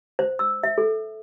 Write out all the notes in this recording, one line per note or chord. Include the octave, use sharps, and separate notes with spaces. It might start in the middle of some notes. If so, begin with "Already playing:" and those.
C5
E6
E5
A4